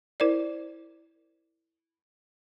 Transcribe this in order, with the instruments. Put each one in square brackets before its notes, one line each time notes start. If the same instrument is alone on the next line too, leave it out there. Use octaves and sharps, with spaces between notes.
[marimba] E4 A#4 C5 D5